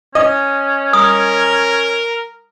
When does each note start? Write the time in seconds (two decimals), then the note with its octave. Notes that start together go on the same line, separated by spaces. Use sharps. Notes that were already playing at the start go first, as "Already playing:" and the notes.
0.15 C#4 D#5
0.93 A#4 D#6